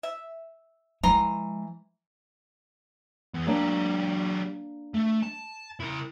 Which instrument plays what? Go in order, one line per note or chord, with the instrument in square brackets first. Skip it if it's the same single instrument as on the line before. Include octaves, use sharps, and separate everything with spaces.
[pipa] E5
[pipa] E3 A#5 C6 [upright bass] F3 G#3
[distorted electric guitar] E2
[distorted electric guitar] F#3 G4 [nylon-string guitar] A#3 D4
[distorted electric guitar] A3
A5
E4 A#4